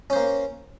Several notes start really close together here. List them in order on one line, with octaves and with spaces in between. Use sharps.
C#4 C5 A#3